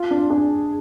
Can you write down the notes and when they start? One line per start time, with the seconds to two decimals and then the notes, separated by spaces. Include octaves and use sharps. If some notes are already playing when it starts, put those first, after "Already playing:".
Already playing: F4
0.11 D4
0.30 D4 G#4